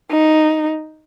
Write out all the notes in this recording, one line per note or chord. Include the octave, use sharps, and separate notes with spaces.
D#4